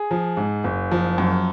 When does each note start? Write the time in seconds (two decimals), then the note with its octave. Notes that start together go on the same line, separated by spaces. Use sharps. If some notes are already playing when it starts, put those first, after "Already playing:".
Already playing: G#4
0.11 F3
0.37 G#2
0.64 F#1
0.91 F3
1.18 F#2